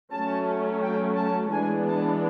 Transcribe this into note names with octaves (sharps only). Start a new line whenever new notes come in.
F#3 A3 C#4 A5
G5
A5
E3 G#3 B3 D4 G#5
A5